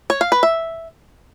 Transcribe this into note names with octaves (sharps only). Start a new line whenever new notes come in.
C#5
F5
B4
E5